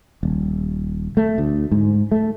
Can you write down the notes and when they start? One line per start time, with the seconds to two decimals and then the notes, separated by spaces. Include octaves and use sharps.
0.23 D#1
1.17 A3
1.38 D2
1.71 G#2
2.12 A3